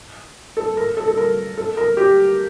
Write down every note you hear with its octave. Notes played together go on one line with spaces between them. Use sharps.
A4
A#4
A4
A4
A#4
A4
A#4
G4